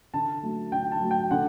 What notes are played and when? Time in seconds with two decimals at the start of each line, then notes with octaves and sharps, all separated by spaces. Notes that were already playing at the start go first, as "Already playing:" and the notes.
0.14 D3 A5
0.43 F#3 A3
0.72 D3 G5
0.92 A5
1.01 F#3 A3
1.11 G5
1.31 D3 F#5